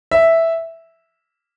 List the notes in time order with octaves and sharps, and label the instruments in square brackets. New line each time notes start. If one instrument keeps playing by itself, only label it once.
[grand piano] E5